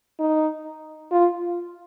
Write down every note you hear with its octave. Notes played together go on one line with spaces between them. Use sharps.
D#4
F4